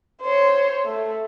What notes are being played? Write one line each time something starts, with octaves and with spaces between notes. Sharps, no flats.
C5 C#5
A3